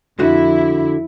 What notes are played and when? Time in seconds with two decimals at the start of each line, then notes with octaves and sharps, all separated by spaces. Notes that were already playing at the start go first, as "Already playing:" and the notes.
0.19 F2 D3 E4 F#4